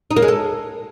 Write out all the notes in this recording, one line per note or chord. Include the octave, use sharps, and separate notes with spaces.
D#4
A#3
G#3
A4